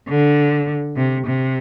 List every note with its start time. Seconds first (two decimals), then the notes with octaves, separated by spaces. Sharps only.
0.09 D3
0.96 C3
1.27 C3